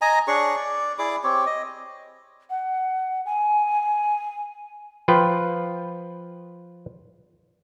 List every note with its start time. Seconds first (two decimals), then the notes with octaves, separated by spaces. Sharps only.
0.01 D#5 G#5 A#5
0.28 D4 G#4 C#5 C#6
0.56 D5
0.98 E4 G#4 D5 D6
1.24 C4 G4 C#5
1.46 D#5
2.50 F#5
3.26 G#5
5.08 F3 F4 B4 G5